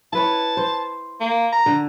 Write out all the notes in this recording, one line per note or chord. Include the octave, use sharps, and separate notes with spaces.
E4 B4 C#5 A5
C5
A#3
A#5
D3